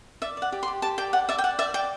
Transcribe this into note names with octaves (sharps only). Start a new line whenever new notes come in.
D5 E5
D5 F#5
G4
C6
G4
G4 A5
D5 G5
D5 F#5
D5 E5
G5
D5 F#5
D5 E5
D5 G5